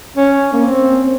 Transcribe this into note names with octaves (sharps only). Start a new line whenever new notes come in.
C#4
A#3
C4